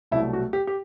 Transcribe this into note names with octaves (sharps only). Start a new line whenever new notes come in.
C2 B2 F#3 A3 E4
F#4
G4
G4